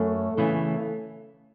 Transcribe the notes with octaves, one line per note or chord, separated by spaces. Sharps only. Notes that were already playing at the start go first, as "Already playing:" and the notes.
Already playing: F#2 A3
C#3 E3 A3 B3